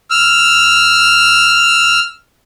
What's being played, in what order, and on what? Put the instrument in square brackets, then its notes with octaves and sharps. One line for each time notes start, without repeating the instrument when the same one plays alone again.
[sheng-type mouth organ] E6 F6